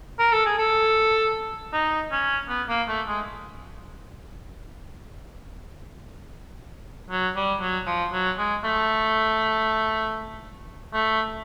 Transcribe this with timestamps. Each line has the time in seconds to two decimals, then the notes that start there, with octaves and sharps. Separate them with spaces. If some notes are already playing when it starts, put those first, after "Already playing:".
0.19 A#4
0.32 A4
0.46 G#4
0.58 A4
1.73 D#4
2.11 C#4
2.49 B3
2.69 A#3
2.88 A3
3.07 G#3
7.11 F#3
7.36 G3
7.61 F#3
7.86 F3
8.13 F#3
8.38 G#3
8.64 A3
10.94 A3